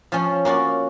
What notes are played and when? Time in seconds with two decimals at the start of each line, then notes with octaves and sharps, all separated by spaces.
0.12 F3 C#4
0.45 A#3 C#4 F#4 D5